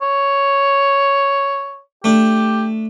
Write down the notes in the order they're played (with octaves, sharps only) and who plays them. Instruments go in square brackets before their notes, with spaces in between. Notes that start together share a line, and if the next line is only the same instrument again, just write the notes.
[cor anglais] C#5
[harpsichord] A3 D4 [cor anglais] G4